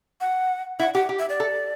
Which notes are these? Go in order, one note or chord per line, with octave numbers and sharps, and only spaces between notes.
F#5
E4 F#5
G4 F#5
G4
E5
D5
A4